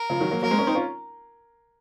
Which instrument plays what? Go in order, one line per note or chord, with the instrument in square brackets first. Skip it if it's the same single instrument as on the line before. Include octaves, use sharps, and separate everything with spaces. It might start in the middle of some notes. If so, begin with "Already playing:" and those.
Already playing: [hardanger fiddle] A#4
[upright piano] C#3 F3
D#3 F#3
F#3 A#3
[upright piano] F#3 A#3 [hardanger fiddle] A#4
[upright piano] G#3 C4
A#3 C#4
C4 D#4
C#4 F4